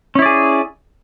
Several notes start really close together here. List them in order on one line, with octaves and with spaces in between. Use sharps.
C#4 E4 D5 G#4